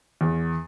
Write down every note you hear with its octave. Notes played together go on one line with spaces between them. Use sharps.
E2